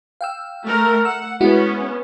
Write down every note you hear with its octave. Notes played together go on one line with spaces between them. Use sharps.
F5 G5 E6
A3 A#4
F#5 E6
G#3 B3 C#4 E4 F#4